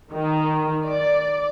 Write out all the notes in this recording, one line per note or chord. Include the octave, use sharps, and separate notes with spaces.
D#3
D5